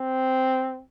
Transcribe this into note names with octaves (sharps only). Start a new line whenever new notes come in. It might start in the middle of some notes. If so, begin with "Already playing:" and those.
Already playing: C4